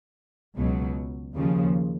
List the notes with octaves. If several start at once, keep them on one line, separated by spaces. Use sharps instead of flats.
C#2 B2 F#3
D#2 C#3 F3